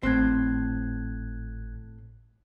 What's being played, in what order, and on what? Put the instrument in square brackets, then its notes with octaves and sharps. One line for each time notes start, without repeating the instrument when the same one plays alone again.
[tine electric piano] G#1 F#6 G#6 [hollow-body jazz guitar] A2 C4